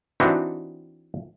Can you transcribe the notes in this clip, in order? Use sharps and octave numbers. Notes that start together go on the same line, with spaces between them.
E3 C4 D4 D#4 F#4 G4